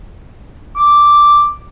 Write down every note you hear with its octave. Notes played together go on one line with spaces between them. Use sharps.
D6